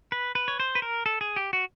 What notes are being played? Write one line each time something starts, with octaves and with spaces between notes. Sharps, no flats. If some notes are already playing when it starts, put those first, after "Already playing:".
B4
B4
C#5
C5
B4
A#4
A4
G#4
G4
F#4